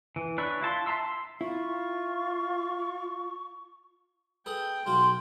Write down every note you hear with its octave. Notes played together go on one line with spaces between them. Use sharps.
E3
D4 B4 C#5 E5
E4 F4 A5 C6
E5 A5 A#5 C6 E6
C6
E4 F4 C#6
G#4 A4 B4 G5
B1 F4 F#4 C6